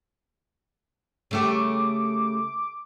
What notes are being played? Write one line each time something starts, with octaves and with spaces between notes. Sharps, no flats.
C#3 A3 G4 D6